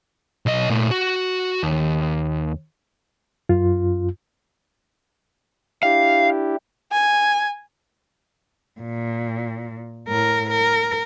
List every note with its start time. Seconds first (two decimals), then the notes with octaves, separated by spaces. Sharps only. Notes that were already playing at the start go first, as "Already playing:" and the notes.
0.46 B1 D#5
0.70 A#2 A3
0.91 F#4
1.63 D#2
3.49 F#2 F4
5.83 D4 E4 G4 F5
6.92 G#5
8.81 A#2
10.08 A2 A#4
10.50 A#4